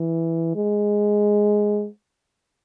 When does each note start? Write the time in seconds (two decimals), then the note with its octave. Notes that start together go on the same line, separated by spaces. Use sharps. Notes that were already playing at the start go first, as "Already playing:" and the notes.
Already playing: E3
0.56 G#3